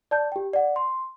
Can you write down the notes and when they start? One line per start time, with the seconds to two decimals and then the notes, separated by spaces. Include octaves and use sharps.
0.11 D5 A5 G6
0.32 G4 G5
0.53 D5 F#5
0.76 C6